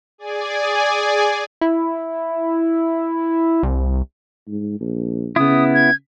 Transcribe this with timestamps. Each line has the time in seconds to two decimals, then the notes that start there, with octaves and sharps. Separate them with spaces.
0.18 G#4 D5 G#5
1.61 E4
3.63 C2
4.48 G#2
4.80 A#1
5.36 C#3 B3 E4 D#6
5.74 G#6